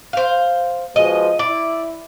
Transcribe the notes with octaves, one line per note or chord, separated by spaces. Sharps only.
C5 F5
B2 F3 G#3 D#5
E4 D5